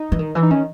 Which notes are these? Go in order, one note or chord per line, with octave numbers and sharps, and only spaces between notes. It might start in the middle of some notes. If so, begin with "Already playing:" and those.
Already playing: D#4
E3
D#3
E3
D#4
D#3 C#4